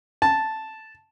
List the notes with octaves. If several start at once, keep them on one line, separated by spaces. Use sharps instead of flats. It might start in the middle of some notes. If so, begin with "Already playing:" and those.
A5